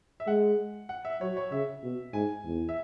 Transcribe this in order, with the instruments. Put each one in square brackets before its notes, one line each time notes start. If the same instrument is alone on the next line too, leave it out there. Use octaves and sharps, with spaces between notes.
[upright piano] E5
[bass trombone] G#3 [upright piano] F#5
[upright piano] F#5
E5
[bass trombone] F#3 [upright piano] C#5
[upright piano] C#5
[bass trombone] C#3 [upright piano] E5
[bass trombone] B2
[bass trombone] G#2 [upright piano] G#5
[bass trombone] E2
[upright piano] E5